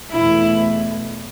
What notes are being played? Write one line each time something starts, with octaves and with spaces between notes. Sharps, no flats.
E2 B2 A3 E4